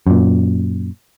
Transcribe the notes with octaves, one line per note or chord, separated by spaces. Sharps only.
F#2 A#2